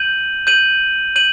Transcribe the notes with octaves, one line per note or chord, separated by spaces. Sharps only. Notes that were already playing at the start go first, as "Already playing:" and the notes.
Already playing: G6 D#7 F#7
G6 D#7 F#7
G6 D#7 F#7